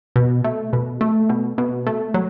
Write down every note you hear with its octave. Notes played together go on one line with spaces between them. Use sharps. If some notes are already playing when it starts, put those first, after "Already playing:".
B2
A3
B2
A3
B2
B2
A3
F#3